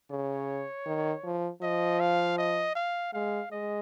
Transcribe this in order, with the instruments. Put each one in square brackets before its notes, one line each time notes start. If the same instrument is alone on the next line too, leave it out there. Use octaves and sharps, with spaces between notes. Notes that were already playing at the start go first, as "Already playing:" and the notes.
[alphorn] C#3 [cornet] C#5
[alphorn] D#3
F3
[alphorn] F3 [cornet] D#5
[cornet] F5
D#5
F5
[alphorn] G#3 [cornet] F5
[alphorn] G#3 [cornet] D#5